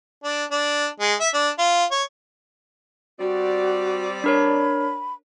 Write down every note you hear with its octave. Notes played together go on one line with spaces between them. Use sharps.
D4
D4
G#3
E5
D4
F4
C#5
G3 C4 F#4 D5
D4 A#4 C#5 B5